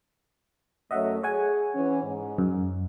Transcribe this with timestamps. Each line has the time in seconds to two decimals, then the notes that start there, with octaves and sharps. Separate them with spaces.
0.91 F#2 A3 C#5 D#5 E5 F#5
1.23 G#4 C#5 F#5 G#5
1.75 E3 C#4
2.03 G#2
2.38 F#2